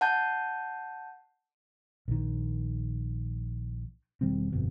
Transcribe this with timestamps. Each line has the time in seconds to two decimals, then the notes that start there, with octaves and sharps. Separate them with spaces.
0.01 F#5 A5 G6
2.08 A#1 D#3
4.21 E1 D#3 G3 C4
4.52 G1 F2 B2